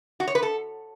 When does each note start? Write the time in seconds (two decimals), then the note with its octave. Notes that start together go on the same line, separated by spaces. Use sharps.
0.20 F#4
0.27 C#5
0.35 B4
0.43 A4